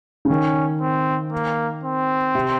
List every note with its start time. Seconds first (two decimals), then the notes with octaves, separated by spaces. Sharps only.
0.25 C#3
0.30 D#3 C#4
0.81 C4
1.32 A#3
1.84 C4
2.35 C3